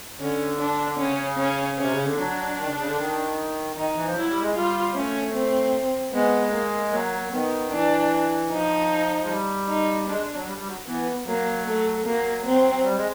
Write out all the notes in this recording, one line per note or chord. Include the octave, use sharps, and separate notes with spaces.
D3 C#4
D4
C#3 C#4
C#4
C3 C#4
C#3
D3
F#3 D4
D#3
C#3
C#3
D3
D#3
D#3 D#4
E3
F3
F#3 E4
G3
G#3
G3 F4
A3 C#4
C4
G#3 B3
A#3
F#3 A#3
D#3 B3
E3 D4
F3 D#4
G#3
G3
D#4
G#3 D4
F#3
G3
G3
F#3
E3 B3
F#3 A#3
A3
F#3 A#3
C4
G3
G#3